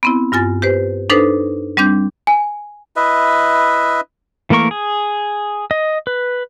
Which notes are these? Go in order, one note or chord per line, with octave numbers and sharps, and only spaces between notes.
B3 C4 E4
G2 F4 G#5 A6
G4 B4 C5
D4 D#4 A4 B4 C5
G3 C4 D4 G6
G#5
E4 B4 D#5 E5
E3 A3 A#3 A#4 C#6
G#4
D#5
B4